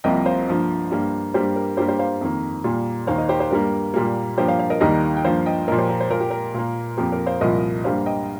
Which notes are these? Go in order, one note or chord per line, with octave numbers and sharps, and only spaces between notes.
C2 C3 F3 A#3 D#5 G5
C5 F5
G2 F3 A#3
G2 G3 A#3
G2 G3 A#3 G4 C5
A#4
G2 G3 A#3 G4 C5
G4 C5
C5 F5
F2 D#3 A#3
A#2 G3 A#3
D#2 D#3 A#3 C5 F5
A#4 D#5
G4 C5
G4 C5
G2 G3 A#3 A#4
A#2 G3 A#3
G2 F3 A#3 G4 C5
C5 F5
C5 F5
A#4 D#5
D#2 D#3 G3 A#3 A#4 D#5
G5
G2 F3 A#3 C5 F5
D#5 G5
A#2 F3 A#3 A#4 D#5
G4 C5
A#4
C5
A#2 A#3 A#4
G4
A#4
A#2 A#3
F2 F3 A#3 G4
A#4
C5 F5
C2 A#2 F3 A#4 D#5
G2 G3 A#3 C5 F5
D#5 G5